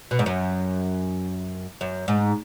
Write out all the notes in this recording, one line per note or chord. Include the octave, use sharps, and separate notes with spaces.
B2
G#2
F#2
F#2
G#2